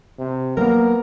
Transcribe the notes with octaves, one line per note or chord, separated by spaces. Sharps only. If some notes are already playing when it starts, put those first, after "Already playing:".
C3
F#3 G#3 A#3 B3 A#4